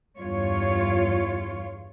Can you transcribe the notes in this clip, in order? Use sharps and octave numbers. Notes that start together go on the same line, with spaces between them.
E2 G2 F4 C#5